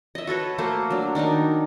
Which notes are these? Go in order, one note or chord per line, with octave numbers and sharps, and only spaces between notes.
D#5 E5
F#4 A4 B4 C#5
A3 A#3 F#4 C5
F#3 D4
D#3 D4 D#4 A#4